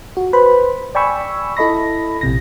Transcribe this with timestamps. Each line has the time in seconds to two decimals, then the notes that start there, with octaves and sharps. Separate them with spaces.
0.17 F#4
0.33 B4 C5 B5
0.95 D5 G5 G#5 B5 C#6 E6
1.57 E4 A4 D#5 B5 A#6
2.21 A#1 C3 A#6